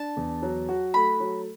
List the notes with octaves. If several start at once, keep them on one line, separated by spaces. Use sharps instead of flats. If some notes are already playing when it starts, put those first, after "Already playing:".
Already playing: D4 A5
E2
F#3
F#4
A3 B5
F#3